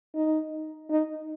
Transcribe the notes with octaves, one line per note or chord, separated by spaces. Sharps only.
D#4
D#4